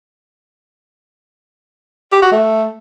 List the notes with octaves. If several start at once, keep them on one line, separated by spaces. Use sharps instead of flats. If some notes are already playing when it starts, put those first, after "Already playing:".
G4
F#4
A3